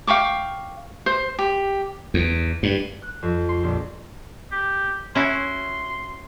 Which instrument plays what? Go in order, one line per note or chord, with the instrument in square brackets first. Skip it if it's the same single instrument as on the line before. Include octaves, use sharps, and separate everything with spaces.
[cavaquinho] F5 G5 C#6 D6
C5
G4
[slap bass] E2
G2
[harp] F#6
F2
C6
A#1
[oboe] G4
[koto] C#4 E4 F#4 [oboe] C6